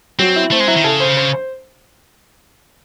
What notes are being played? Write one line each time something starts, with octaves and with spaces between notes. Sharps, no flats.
F#3 C4
E4
A3 C4
G#3
F#3 E4
D#3
C#3 A4
C5
C5
C5